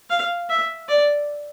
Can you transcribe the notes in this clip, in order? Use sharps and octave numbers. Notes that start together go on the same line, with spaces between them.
F5
E5
D5